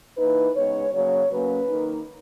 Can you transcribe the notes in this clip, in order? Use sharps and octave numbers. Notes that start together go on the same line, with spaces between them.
E3 A#3 D#4 B4
C#3 G#3 B3 D#4 C#5
C#3 F#3 A#3 C#5
C#3 F#3 A#3 C#4 B4
D#3 A#3 D#4